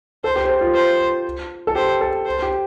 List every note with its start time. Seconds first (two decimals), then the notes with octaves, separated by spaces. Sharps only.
0.24 A4 C5
0.36 G4
0.44 C5
0.49 A4
0.61 F4
0.74 C5
1.67 A4
1.75 G4 C5
2.01 A4
2.26 C5
2.42 G4